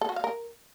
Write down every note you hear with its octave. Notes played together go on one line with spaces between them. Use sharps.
A4
F#4
F5
A#4